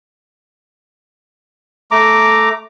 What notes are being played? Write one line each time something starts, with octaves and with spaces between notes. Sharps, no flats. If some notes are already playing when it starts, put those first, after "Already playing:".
A3 A#5 D6